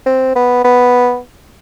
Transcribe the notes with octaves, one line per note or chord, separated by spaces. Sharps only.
C4
B3
B3